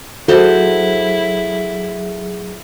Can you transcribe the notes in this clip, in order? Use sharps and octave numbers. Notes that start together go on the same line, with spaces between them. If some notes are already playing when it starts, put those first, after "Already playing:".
F#3 E4 F#4 G#4 A4 C5